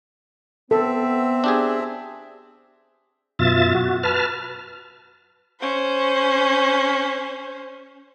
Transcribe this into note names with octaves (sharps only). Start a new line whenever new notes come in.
B3 C4 A4 E5
D4 G4 G#4
F#2 B2 F4 E5 A6
F#4
B4 A5 F6
C#4 C5